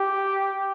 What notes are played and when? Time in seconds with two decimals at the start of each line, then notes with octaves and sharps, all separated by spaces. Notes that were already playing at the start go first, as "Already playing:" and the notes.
Already playing: G4